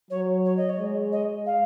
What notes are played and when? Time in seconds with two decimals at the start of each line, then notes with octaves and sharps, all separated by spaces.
0.10 F#3 C#5
0.45 C#5
0.57 D#5
0.69 C#5
0.79 G#3
1.12 D#5
1.46 F5